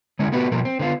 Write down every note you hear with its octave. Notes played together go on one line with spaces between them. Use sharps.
D3 G#3 C#4 E4
A3 B3 F#4 G4 B4
B2 F3 G3 A#3 A#4
C4
D3 B3 F4